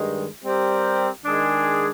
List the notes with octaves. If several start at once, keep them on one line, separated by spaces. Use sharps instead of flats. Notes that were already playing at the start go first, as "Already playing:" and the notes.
Already playing: G2 D#3 G#3
G3 C4 G4 A#4
D#3 G#3 D4 G#4